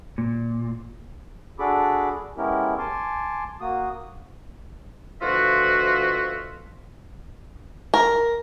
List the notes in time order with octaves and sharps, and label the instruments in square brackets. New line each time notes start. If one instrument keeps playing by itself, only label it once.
[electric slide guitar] A#2
[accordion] D4 F#4 G#4 A4 B5 D6
G#3 B3 C#4 E4 G4 A#4
G#5 A5 C6 D6
A#3 F#4 D#6
[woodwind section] D2 B2 F3 F4 F#4 E5
[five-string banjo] A#4